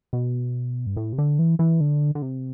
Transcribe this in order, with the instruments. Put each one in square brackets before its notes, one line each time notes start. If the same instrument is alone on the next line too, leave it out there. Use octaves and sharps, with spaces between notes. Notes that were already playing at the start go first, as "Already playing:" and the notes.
[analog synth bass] B2
G2
A2
C3
D3
E3
E3
D3
D3
C3